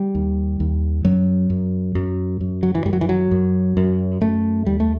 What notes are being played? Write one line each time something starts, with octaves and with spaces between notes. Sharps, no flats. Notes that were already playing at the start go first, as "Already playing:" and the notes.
Already playing: G3
D#2
D#2
F#2 F#3
F#2
F#2
F#2
F#3
E3
F#2 G3
F#3
E3
F#3
F#2
F#2
F#2 A3
D#2 G3
A3